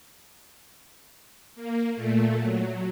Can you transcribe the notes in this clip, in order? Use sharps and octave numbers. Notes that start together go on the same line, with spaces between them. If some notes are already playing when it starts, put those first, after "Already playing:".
A#3
A#2 A3
F#3